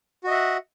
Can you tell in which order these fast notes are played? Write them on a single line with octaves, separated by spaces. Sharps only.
F#4 D#5 E5 F#5